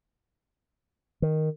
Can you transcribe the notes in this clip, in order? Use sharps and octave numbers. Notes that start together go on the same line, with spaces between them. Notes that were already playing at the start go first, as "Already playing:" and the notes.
D#3